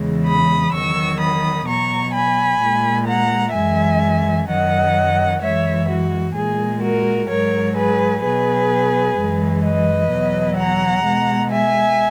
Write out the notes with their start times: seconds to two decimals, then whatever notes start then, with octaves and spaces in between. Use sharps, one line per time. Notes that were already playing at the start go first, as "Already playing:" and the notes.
Already playing: E2 C#3 E3 G#3
0.26 B5 D#6
0.73 E2 D#3 F#3 C#6 E6
1.20 B5 D#6
1.67 B2 F#3 A#5 C#6
2.13 G#5 B5
2.61 A#2 G#3
3.07 F#5 A#5
3.54 F#2 E3 G#3 E5 G#5
4.48 F#2 D#3 F#3 D#5 F#5
5.42 F#2 E3 G#3 C#5 E5
5.88 F#4
6.35 A#2 G#3 G#4
6.82 F#4 A#4
7.29 G#2 F#3 A#4 C#5
7.76 G#4 B4
8.23 B2 F#3 G#4 B4
9.17 F#2 E3 G#3
9.64 B4 D#5
10.10 E2 B2 F#3
10.57 F#5 A#5
11.04 B2 G#3
11.50 E5 G#5